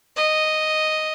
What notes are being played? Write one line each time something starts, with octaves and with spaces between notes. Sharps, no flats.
D#5